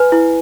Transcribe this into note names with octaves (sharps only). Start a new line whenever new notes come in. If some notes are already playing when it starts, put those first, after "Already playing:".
Already playing: B4 G#5
E4